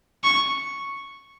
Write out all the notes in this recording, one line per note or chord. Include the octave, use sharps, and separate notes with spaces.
C#6